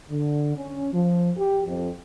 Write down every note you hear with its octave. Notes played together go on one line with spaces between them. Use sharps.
D3
C#4
F3
G4
F2